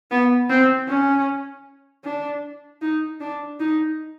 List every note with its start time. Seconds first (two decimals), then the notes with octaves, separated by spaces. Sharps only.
0.11 B3
0.50 C4
0.88 C#4
2.05 D4
2.82 D#4
3.21 D4
3.60 D#4